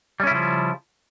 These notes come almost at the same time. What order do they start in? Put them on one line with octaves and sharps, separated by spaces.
G3 C#4 E4 C#3 F3